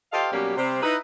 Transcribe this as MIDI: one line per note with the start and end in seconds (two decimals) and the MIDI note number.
0.13 0.29 65
0.13 0.29 67
0.13 0.29 69
0.13 0.29 72
0.13 0.29 75
0.13 0.29 77
0.32 0.53 47
0.32 0.53 54
0.32 0.53 55
0.32 0.53 58
0.32 0.53 61
0.32 0.53 67
0.56 0.80 48
0.56 0.80 55
0.56 0.80 60
0.82 0.96 63
0.82 0.96 64
0.82 0.96 71